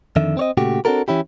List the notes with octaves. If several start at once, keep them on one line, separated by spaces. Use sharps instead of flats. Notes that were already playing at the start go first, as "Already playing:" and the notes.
F2 D3 D#3 E5
C4 C#5 D#5
A#2 C#3 A3 F#4 G4
C4 D4 F#4 A4 A#4
E3 C#4 E4 G4